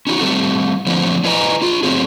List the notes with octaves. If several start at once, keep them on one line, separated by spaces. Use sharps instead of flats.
C#4 D#4 F4 F#4
G3 A3 C4 A4
D3 F3 A3 A#3 C4 D4
D4 E4 B4 D#5 G#5 A#5
D4 F4
F#3 A3 C4 G#4